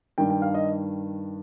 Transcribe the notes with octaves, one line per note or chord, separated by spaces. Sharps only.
G2 D#3 G5
G5
F5
D#5